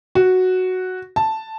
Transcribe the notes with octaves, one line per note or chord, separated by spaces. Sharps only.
F#4
A5